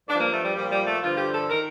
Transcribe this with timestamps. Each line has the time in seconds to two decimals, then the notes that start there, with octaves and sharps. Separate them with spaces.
0.08 G2 D4
0.13 F3
0.20 A#3
0.32 A3
0.44 G3
0.55 A#2 F3 G3
0.70 G3
0.86 A3
1.02 G2 D3 F3 F4
1.17 G4
1.34 A4
1.49 D#3 A#4